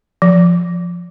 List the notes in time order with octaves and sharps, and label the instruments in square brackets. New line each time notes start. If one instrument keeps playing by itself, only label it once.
[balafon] F3